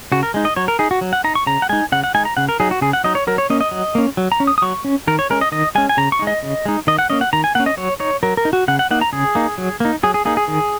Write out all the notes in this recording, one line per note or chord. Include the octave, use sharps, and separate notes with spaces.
C#3 F#4
A#4
G#3 D#4
D#5
F#3 C#5
A#4
D#4 G#4
F#4
F#3
F#5
D#4 A#5
C#6
C#3 A#5
F#5
G#3 D#4 G#5
C#3 F#5
F#5
G#3 D#4 G#5
A#5
C#3 F#5
A#4
F#3 D#4 G#4
F#4
C#3 G#4
F#5
F#3 D#4 D#5
C#5
F#3 A#4
C#5
A#3 C#4 D#5
D#5
F#3
A#3 C#4
F#3
A#5
C#4
D#6
D#6
F#3 C#6
C#4
D#3 A#4
C#5
G#3 C#4 A#4
D#5
D#3 D#5
G#3 C#4 G#5
G#5
C#3 A#5
C#6
G#3 D#4
D#5
C#3
G#3 D#4
D#3 D#5
F#5
A#3 C#4 D#5
F#5
D#3 A#5
G#5
A#3 C#4 F#5
D#5
F#3 C#5
D#4 C#5
F#3 A#4
A#4
D#4
F#4
C#3 F#5
F#5
A#3 D#4 F#5
A#5
C#3 G#4
A#3 D#4
F#3
A#3 D#4
F#3 G#4
G#4
A#3 D#4 G#4
G#4
D#3